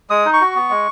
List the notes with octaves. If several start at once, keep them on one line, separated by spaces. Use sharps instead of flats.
G#3 D#6
D#4
C#6
F#4
B3
G#3